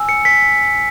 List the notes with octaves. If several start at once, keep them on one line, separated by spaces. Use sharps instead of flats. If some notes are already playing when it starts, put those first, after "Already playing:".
Already playing: G#5 E6
C#7
B6